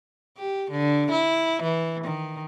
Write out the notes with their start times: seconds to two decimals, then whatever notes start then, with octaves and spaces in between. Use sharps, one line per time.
0.38 G4
0.71 D3
1.11 E4
1.63 E3
2.05 D#3